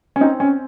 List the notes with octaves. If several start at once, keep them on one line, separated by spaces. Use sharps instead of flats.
C#4
C4 D#4
C#4